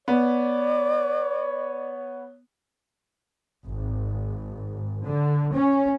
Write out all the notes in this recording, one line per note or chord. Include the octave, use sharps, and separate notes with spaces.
B3 C#5 D5
G#1
D3
C#4